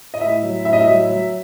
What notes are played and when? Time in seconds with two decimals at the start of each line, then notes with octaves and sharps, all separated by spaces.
0.14 D#5
0.21 A2 E5
0.43 F#3
0.65 A2 E5
0.73 D#5
0.81 E5
0.87 F#3
1.10 F#3